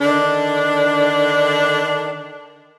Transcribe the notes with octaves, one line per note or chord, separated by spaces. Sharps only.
D3 D#3 D4